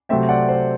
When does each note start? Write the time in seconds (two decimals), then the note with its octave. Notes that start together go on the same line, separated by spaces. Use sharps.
0.09 C3 F#3 A3 C4 E5 G5
0.29 D5 F#5
0.49 C5